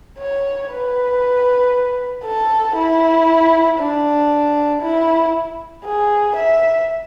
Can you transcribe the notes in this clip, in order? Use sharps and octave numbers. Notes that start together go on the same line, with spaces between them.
C#5
B4
A4
E4
D4
E4
G#4
E5